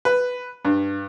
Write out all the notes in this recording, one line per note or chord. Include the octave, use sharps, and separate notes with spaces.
B4
G2